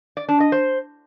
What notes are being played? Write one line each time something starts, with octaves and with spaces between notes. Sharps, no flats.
D5
D4
D#5
C5